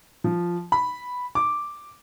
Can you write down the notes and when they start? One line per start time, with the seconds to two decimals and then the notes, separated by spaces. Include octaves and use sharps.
0.24 F3
0.72 B5
1.35 D6